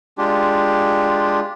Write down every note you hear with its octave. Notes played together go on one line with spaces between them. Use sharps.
G#3 D4 F4 G4